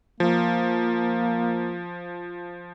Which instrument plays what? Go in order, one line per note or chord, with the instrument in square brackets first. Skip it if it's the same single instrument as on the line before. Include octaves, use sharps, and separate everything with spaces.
[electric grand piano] F3 [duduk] A#3